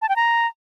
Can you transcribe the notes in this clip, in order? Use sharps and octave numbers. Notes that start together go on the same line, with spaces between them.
A5
G5
A#5